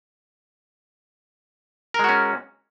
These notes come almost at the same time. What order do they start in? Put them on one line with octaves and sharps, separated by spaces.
A#4 G#3 F#4 C#4